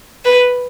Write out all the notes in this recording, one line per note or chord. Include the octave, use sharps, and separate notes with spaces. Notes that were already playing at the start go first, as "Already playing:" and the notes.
B4